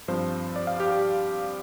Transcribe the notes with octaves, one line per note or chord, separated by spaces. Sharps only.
G2 F3 C4 C5
D5
F5
G4
G4